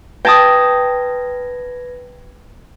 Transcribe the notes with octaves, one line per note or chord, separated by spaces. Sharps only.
B4 G5 A5 D#6 G#6 A#6